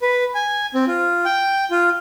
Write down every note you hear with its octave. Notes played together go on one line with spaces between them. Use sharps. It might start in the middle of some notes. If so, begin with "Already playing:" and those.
B4
G#5
C4
F4
G5
F4